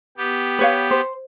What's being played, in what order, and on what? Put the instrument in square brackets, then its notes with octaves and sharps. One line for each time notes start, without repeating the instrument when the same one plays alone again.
[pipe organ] B3 G4
[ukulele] B4 C#5 F5
C5